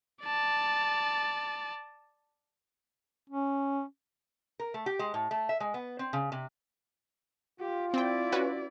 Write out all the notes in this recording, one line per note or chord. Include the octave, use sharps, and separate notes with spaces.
D5 A5
C#4
A#4
A3
G4
G#3
A2
A3
E5
G#3
B3
C4
C#3
C3
F4 G4
C4 E4 D5 G5
C#4 F#4 B4